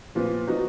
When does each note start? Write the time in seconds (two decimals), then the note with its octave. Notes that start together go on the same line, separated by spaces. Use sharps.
0.15 A#2 F3 B3
0.47 F3 B3 D#4 F#4